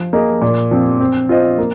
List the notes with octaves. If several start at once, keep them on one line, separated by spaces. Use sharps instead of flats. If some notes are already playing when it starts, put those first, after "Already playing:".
Already playing: F3
A#3 G#4 D#5
A#2
F3 C4
C4
F4 C5 D#5
A#3